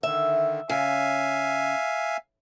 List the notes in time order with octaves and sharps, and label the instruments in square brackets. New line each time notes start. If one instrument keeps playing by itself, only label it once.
[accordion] D3 D#3 [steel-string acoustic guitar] E5
[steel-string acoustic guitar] C#3 [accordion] E5 F5 G#5